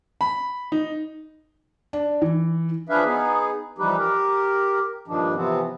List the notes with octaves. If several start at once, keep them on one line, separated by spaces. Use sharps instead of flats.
B5
D#4
D4
E3
F3 D4 G#4 B4 E5 F5
B3 D#4 G#4
E3 F3 G3 D#4 G4 B4
G4 A#4
G2 A#2 D#3 F3 D4
C3 E3 F3 B3 C4